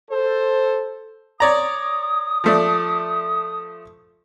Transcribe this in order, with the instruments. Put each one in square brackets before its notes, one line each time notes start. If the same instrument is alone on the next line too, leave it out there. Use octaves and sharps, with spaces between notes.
[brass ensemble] A4 C5
[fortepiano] C#5 D5 A#5 [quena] D#6
[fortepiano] F3 A3 D5